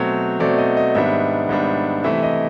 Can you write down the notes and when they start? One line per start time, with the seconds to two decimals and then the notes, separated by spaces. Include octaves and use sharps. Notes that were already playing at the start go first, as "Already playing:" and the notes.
Already playing: B2 F#3 A3 C4
0.40 B2 F#3 A3 C4 D5
0.58 D#5
0.77 D#5
0.95 G#2 D#3 G3 B3 D4 E5
1.49 G#2 D#3 G3 B3 D4
2.04 C3 E3 A3 E5
2.23 D#5